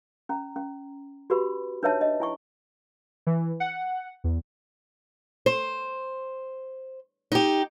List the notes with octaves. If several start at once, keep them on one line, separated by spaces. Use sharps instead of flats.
C#4 A#5
C#4
F#4 G4 B4 B5
D4 D#4 B4 C#5 E5 A5
D#5
E4 G#5 C#6
E3
F#5
E2
C5
D#4 G4